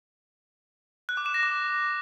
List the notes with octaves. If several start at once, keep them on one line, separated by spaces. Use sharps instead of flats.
F#6
D6
E7
A#6
D6